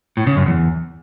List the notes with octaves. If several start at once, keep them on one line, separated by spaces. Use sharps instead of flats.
A2
C#3
F#2
E2